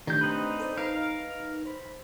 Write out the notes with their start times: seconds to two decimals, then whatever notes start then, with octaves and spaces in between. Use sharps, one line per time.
0.07 D#3 A3 D4 G4 G6
0.21 C4 D#4 B4
0.60 A4 C5 D5
0.77 D#4 A#4 B4 F5
1.65 C5 B5